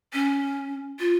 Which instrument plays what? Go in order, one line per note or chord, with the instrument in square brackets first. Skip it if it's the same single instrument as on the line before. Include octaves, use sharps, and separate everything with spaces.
[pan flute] C#4
F4